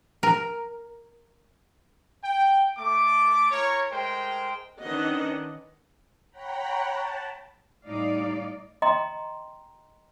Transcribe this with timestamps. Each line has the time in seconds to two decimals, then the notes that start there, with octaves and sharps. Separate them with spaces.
0.23 A#4
2.24 G5
2.77 A3 D6
3.51 E4 A#4 C#5
3.91 G#3 A3 A#4 C5 G5
4.80 D#3 C#4 D4 B4 D#5 F#5
6.30 C#5 F#5 G5 A#5 B5
6.81 A5
7.85 A2 G3 D#4 D5 F5
8.82 D#5 G5 A#5 C6